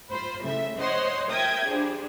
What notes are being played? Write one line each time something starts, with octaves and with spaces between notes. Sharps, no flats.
F4 C5 B5
A2 C#3 E5
C5 C#5 D#5 F#5 C6
A#4 E5 G5 D#6 G#6
F3 G3 D4 G#4